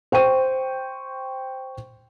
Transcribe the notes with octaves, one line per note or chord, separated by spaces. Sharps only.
C5 G5 C#6 D#7